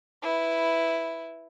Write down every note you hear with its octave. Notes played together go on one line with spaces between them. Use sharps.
E4 B4